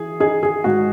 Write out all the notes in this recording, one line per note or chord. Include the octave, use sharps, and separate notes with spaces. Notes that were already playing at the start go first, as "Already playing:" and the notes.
Already playing: E3 G#4
D#4 G#4
G#4
G#2 F#4